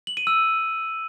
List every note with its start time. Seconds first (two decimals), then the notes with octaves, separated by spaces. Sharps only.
0.07 F#7
0.17 D#7
0.27 E6